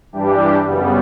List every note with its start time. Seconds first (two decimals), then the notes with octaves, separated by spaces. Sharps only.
0.12 G2 E3 G3 D4 G4
0.66 F#2 C#3 G3 B3